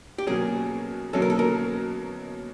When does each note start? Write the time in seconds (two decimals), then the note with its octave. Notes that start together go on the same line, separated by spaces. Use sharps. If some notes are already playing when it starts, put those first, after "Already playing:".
0.18 G4
0.27 B2 F#3 A#3 C#4 G#4
1.13 B2 F#3 A#3 C#4 A4
1.22 A#4
1.30 A4
1.39 A#4